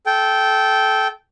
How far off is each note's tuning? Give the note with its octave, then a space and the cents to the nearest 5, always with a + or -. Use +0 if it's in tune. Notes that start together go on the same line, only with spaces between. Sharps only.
A4 -25 G5 -10